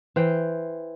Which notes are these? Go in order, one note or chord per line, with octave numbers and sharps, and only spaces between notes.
E3 C5 G5